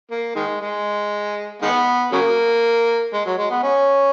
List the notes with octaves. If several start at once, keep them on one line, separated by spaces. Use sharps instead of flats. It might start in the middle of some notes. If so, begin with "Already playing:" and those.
A#3
D#3 G#3
G#3
D#3 G#3 B3
C#3 F#3 A#3
G#3
F#3
G#3
B3
C#4